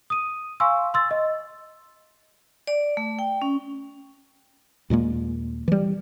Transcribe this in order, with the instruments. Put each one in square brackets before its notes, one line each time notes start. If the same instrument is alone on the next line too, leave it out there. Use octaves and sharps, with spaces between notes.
[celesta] D#6 D#7
F5 G#5 C6 C#6 E6
C6 E6 A6
D#5
[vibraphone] D5
A3
G5
C#4
[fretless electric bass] D#2 A#2 G#3 A#3
E3 G3